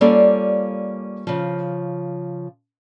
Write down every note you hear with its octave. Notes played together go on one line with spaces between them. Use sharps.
G3 A#3 C#4 F4 A4 D5
C#3 F3